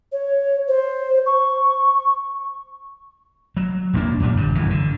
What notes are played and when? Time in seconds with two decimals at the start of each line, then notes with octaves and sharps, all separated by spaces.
0.12 C#5
0.68 C5
1.26 C#6
3.57 F#3
3.93 E1 C2 A#3 D4
4.20 F#2 A#2 F#3 G3
4.37 G1 G2
4.55 F1 F#2 D#3 E3
4.70 D3